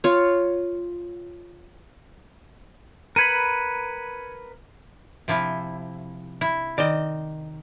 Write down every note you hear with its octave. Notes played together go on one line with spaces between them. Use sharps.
F4 C#5
A#4 B4 B5 G#6 C#7 D#7
C3 F3 E4
E4
D#3 D5 D#5